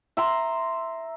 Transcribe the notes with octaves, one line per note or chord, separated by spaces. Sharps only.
E5 A#5 C6